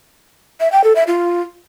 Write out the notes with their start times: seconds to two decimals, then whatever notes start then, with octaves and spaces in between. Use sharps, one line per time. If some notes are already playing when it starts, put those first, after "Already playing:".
0.61 E5
0.72 G5
0.84 A4
0.96 E5
1.07 F4